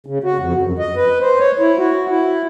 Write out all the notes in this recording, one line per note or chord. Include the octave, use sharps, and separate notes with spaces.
C#3
F#4
F2
F#2
D#5
B4
C5
C#5
E4
F#4
E4